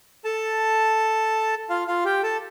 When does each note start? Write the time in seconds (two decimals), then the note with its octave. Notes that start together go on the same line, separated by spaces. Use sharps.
0.25 A4 A5
1.70 F4 F5
1.88 F4 F5
2.05 G4 G5
2.23 A4 A5